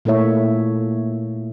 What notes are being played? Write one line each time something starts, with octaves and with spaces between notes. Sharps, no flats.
A#2 A3 A#3 E4 C#5 E5